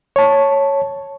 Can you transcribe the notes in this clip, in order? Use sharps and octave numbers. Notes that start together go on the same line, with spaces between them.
C#5 A5